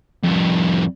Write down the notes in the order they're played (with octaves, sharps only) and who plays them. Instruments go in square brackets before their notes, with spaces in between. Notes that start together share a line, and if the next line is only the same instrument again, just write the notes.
[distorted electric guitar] F2 G3